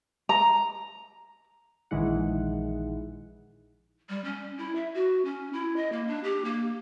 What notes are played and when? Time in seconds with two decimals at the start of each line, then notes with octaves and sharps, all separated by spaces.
0.29 A#5
1.91 A#1 D#3 E3 G#3 E4 F#5
4.09 G3
4.25 C#4
4.58 E4
4.76 E5
4.94 F#4
5.25 C#4
5.53 E4
5.76 D#5
5.92 A#3
6.08 D4
6.24 G4
6.45 A#3